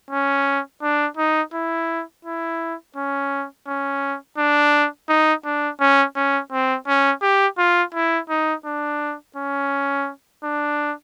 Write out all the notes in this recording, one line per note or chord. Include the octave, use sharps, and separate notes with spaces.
C#4
D4
D#4
E4
E4
C#4
C#4
D4
D#4
D4
C#4
C#4
C4
C#4
G4
F4
E4
D#4
D4
C#4
D4